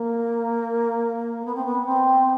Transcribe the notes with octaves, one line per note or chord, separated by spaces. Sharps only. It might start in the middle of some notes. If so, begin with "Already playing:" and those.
Already playing: A#3
B3
C4
B3
C4